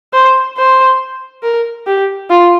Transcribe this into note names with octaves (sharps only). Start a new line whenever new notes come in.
C5
C5
A#4
G4
F4